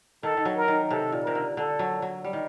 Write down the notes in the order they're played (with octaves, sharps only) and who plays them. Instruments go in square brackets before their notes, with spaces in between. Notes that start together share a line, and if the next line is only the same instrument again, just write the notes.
[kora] D#3 [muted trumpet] A4
[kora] D#3
F#3
[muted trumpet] A#4
[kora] D#3
[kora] C3 [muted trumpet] A4
[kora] A#2
[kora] C3 [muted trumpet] A#4
[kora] D3
[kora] D3 [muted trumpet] A4
[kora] F#3
F#3
G3
D#3